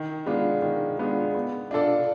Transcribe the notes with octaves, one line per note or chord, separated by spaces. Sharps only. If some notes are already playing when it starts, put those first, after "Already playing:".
Already playing: D#3
G#3 B3 D4 F4
D#3
G#3 B3 D4 F4
B3
D4 F4 A4 D5